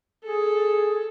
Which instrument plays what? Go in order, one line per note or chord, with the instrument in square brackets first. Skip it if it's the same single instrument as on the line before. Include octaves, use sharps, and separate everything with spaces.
[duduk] G#4 [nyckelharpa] A4